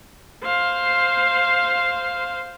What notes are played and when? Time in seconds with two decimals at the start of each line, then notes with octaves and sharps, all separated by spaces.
0.44 C5 F5